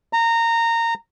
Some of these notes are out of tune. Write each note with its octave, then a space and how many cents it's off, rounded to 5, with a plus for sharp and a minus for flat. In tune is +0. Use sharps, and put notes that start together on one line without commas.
A#5 -20